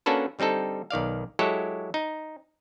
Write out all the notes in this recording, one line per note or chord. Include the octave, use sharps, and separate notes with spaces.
A#3 C#4 D4 F#4 A4 B4
D3 G3 C4 D#4 A4
B1 D#3 D5 F5
F#3 G#3 E4 G4 A4 C#5
D#4